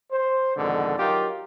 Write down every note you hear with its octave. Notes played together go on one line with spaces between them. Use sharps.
C5
F2 G#2 B2 D3 D#3
F#3 D#4 F4 G4 A#4